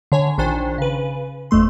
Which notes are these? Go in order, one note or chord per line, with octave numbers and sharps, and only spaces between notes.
D3 C#5 G#5
A#1 D#3 D4 C5 G#5
C#3 B4
G1 F2 A3 C6